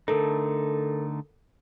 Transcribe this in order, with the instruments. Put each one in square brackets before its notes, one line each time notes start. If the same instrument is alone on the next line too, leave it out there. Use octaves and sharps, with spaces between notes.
[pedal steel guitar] D3 A3 D#4 [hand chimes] A4 A#4